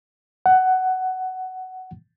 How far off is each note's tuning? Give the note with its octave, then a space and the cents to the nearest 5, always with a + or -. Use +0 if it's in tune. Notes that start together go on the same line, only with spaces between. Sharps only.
F#5 +15